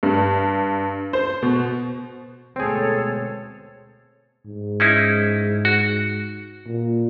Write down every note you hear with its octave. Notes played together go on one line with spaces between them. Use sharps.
G2
C5
B2
D2 B2 G#3 C4 G#4 A4 C#5
G#2
C#4 D#4 E4
F#4
A#2